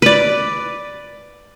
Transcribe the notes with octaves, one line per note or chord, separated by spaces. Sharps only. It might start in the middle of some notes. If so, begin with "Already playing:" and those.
B4 D5